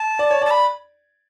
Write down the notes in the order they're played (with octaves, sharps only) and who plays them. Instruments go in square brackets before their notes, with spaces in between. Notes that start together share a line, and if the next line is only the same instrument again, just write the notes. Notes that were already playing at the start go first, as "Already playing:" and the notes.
Already playing: [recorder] A5
[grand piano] D5
C#5
[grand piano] D5 [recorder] A5
[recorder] B5